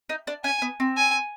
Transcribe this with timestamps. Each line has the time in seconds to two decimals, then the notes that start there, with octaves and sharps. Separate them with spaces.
0.09 D#4
0.27 D4
0.44 C#4 G#5
0.62 B3
0.80 C4
0.97 G#5